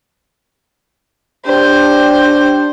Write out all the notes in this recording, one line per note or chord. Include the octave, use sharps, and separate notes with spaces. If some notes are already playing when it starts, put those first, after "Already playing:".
D4 G4 C5